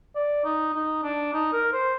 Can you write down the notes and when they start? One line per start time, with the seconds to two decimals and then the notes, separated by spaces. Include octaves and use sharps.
0.16 D5
0.45 D#4
0.74 D#4
1.03 D4
1.34 D#4
1.53 A#4
1.73 C5